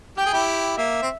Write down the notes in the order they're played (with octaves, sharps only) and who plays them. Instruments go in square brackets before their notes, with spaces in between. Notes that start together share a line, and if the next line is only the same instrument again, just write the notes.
[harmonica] G4 [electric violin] G5
[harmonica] G#4
E4 G4
[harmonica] A#3 [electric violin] E5
[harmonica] C4